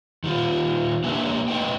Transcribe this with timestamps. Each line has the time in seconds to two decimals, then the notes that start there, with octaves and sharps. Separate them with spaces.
0.24 D#3 G3 F4
1.04 A#3 D4 G4 B4 E5 G#5
1.48 A3 D#4 B4 C5 D#5 G5